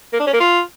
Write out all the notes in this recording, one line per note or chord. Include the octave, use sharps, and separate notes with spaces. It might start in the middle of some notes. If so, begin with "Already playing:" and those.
A#3
D4
C#4
A#3
F4